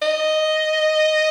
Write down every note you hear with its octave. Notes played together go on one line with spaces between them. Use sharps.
D#5